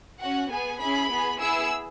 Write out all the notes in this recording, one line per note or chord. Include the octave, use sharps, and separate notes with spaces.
C#4 F#4 F#5
B3 G#4 G#5
C#4 E4 G#4 B5
B3 G#4
B3 E4 G#4 E6